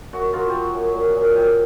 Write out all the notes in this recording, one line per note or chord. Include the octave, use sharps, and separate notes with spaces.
F#2 F#4
F#3 F4
F#3 F#4 G4
F#2
A#2
A#2
F3 G4